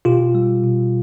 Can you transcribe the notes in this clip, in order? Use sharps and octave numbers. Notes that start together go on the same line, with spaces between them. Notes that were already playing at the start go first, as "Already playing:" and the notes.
B2 F4 G4
G3
B2